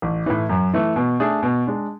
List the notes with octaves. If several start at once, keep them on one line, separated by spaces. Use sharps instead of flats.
A1
A2 E3
F#2
E3 A3
B2
A3 D4 G#4
B2
G#3 D4